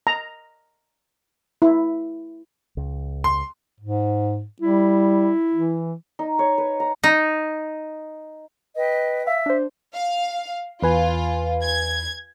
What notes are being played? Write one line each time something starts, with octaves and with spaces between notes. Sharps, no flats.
A#5
E4
C#2
C6
G#2
G3 E4
E3
D#4
C#5
B4
A#5
D#4
B4 D#5 G5
E5 F5
D4 C5
F5
E2 F4 B4 G#5
G#6